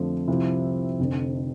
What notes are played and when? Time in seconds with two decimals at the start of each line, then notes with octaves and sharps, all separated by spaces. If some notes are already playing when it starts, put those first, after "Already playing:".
Already playing: F2 D3 F3 A3 C4
0.28 C2 C3 F3 C4 E4
0.99 F1 F2 D3